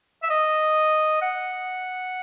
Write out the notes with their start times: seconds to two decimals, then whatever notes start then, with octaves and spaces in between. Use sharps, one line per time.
0.23 E5
0.30 D#5
1.22 F#5